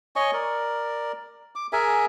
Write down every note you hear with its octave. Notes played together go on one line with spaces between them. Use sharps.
C#5 D#5 G#5 C#6
A#4 D5
D6
G#4 A#4 E5 G#5